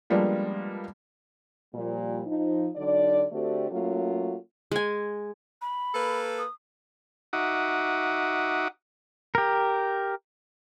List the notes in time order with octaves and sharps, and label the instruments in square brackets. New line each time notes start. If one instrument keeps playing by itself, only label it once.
[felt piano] F3 G3 G#3 A#3 B3 D4
[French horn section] A#2 F3 G3
F3 D#4
D3 F#3 D#4 D5
D3 A3 C4 F#4 G4 D5
F#3 A3 A#3 C#4 F4 F#4
[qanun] G#3 G#5
[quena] B5
[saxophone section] A#3 A4 B4
[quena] D#6
[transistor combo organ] D#4 F#4 E5 F#5 D6 D#6
[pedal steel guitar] G4 A#4